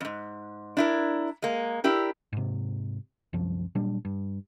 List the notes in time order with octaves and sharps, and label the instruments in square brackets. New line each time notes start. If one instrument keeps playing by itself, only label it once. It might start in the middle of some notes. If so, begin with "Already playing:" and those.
[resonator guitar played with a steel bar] F2 G#2
D4 E4 A#4
G#3 A#3
D4 E4 G4 A#4
[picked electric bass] G#2 C3
C2 F#2 F3
A#2 F#3 G3 D4
G2